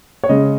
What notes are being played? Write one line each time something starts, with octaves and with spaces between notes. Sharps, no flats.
C#5
C#3 G#3 C#4 D#5